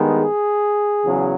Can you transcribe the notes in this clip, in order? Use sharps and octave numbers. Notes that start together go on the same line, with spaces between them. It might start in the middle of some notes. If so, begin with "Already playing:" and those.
Already playing: G2 D#3 G#3 B3
G#4
E2 C#3 F#3